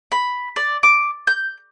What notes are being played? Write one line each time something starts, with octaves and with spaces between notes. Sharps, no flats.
B5
D5
D6
G6